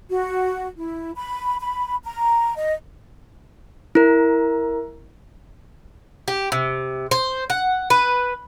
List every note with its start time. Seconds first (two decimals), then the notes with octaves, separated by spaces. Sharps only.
0.10 F#4
0.78 E4
1.15 B5
1.60 B5
2.05 A#5
2.57 D#5
3.95 E4 A#4
6.28 G4
6.52 C3
7.11 C5
7.50 F#5
7.90 B4